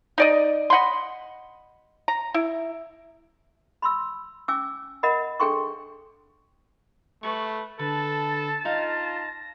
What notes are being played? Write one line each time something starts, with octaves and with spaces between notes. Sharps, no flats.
D#4 D5 D#5
D#5 F#5 B5 C6
A#5
E4
B5 C6 E6
C#4 G#5 D6 E6
A#4 D#5 F#5 B5
D4 G#4 A4 G5 C6 C#6
A3 B4 C#6
D3 A4 B4 A5
D#4 F4 F5 A#6